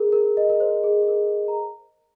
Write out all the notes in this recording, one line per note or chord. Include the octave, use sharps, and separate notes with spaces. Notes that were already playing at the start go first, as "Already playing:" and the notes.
Already playing: G#4 A#4
A#4
D#5
A#4
C5
G#4
G#4
A#4
A#5